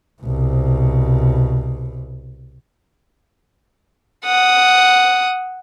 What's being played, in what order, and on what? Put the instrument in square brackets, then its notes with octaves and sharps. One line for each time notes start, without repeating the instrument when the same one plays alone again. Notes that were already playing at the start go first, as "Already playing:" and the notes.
[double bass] C2 B2
[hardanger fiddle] F#5 D#6